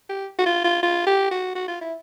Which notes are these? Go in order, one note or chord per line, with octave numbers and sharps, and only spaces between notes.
G4
F#4
F4
F4
F4
G4
F#4
F#4
F4
E4